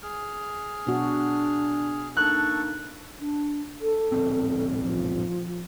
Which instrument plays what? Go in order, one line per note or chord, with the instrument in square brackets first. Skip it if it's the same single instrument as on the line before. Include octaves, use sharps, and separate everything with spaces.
[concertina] G#4 F6
[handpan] B2 F#4 [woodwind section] D4
[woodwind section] A#3 D4 D#4 [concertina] A4 A5 C#6 [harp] F#6
[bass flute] D4
A4
[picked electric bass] D1 A#1 C4
[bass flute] F3